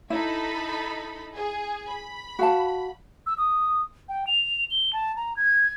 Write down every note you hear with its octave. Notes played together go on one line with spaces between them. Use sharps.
D#4 E4 A4 B5
G#4
B5
F#4 F5 A5
E6
D#6
G5
F7
G7
A5
A#5
G#6